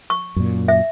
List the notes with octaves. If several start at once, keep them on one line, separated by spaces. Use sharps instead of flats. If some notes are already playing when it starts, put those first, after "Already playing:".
C#6
F#2 A#2
E5